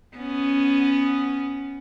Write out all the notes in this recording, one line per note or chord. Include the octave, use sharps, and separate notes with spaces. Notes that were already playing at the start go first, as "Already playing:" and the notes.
B3 C#4